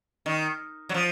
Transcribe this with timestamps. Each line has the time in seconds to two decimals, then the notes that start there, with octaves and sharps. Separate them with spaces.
0.26 D#3
0.89 F#3
0.94 F3